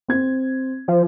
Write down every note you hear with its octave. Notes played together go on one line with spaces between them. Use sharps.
C4 G#6
F3